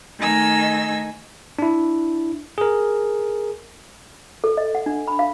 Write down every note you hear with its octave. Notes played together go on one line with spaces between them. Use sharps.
D#3 A3 D#4 G#5 E6 A#6
D4 E4
G#4 A#4
A4
D#5
F#5
D4
B5
F5